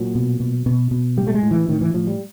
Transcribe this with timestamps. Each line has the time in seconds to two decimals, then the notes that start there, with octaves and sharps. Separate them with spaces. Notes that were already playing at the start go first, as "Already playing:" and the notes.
Already playing: A#2 F#3
0.15 B2
0.40 B2
0.66 B2
0.91 B2
1.17 A2 G3
1.27 A3
1.34 G#3
1.43 A2
1.51 E3
1.68 A2 D#3
1.81 E3
1.94 A2 F3
2.07 G3